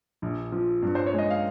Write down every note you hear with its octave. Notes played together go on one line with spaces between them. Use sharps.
A#1
F3
G2
C5
C#5
G#3
D#5
F5